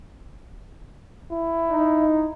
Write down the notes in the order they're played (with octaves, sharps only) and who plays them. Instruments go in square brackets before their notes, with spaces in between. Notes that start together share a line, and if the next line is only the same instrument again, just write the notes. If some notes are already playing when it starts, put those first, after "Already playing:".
[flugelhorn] E4
[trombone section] D#4